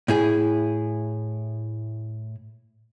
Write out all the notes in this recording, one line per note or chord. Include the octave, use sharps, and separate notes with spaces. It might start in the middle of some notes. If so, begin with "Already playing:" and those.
A2 E4 G#4